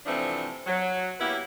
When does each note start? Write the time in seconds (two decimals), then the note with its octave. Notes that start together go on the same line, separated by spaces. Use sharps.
0.06 C3 E3 F3 A3 C4 D4
0.67 F#3
1.20 A#3 B3 C#4 E4 G4 B4